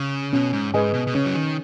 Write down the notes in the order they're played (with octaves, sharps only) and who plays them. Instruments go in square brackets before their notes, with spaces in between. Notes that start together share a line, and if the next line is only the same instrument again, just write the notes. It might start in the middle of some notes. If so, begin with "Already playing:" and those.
Already playing: [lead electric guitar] C#3
[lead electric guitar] B2 [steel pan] C#4
[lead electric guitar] G#2
[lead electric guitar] G#2 [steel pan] G#4 B4 D#5 G#5
[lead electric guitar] B2
B2
[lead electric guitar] C#3 [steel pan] C#4
[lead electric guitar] F#3
D#3